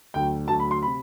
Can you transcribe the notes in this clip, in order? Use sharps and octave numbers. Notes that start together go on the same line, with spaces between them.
D2 D3 F#3 G5
D2 D3 F#3 A5
B5
C6
C3 B5